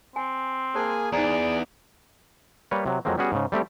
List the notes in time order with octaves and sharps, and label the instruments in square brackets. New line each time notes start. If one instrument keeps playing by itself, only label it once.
[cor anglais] C4 [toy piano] G#5
[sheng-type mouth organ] A#3 G#4 G#5 [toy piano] C5 A5 C6
[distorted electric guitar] E2 [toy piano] D#4 C5 A#5 [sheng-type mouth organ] G#4 [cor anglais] D5
[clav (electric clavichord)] G3 A#3 B4 C#5
C3 F#3
F2 F#3 G#3 A#3 C4
G3 B3 C#4 F#4 G#4
G#2 C#3
G3 A3 C4 G4